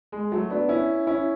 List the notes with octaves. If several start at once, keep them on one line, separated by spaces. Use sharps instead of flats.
G#3
F#3 A3
B3 D4
C#4 E4
C#4 E4